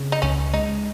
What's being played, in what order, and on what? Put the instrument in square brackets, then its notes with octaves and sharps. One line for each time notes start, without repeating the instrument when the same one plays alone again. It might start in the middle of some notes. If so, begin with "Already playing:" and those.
Already playing: [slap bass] C#3 C4
[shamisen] D#4
[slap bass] C#2 [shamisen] C#4
[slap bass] G#3 [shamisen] D#4